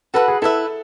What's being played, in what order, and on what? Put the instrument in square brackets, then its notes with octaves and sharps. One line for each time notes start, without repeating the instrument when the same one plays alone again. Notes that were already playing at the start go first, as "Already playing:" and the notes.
[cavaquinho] F#4 B4 F#5 B5 [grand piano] A4
[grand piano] G#4
[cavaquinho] E4 B4 E5 [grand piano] A4